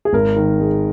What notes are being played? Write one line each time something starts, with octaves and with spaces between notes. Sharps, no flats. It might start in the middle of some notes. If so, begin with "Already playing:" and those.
G#4
G#1 A#4
D#3
G#3